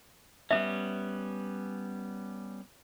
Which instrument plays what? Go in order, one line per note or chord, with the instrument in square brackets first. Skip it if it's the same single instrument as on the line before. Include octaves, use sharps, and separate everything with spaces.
[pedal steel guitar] G3 B3 C#4 [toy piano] E5